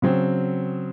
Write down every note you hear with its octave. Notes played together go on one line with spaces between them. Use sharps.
C#3 F#3 C4